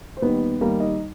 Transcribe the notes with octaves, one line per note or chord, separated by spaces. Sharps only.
C5
D#2 D#3 G3 B3 B4
D#2 D#3 G3 A#3 A#4
D#4 D#5